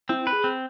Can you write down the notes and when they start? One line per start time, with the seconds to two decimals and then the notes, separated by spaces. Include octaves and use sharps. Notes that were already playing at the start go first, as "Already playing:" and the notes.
0.09 C4 E4
0.27 B4
0.33 G#4
0.44 C4